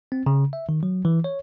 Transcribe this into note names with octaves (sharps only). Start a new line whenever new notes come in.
C4
C#3
E5
D#3
F#3
E3
C#5